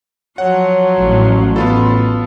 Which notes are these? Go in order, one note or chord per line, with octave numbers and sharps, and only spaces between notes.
F3 F#3 C#5 F#5
A1
B3 F4 A4 B5 C6